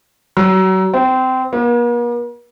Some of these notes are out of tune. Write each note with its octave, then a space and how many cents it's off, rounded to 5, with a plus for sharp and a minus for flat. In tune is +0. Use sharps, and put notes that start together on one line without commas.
F#3 +30
C4 -20
A#3 +45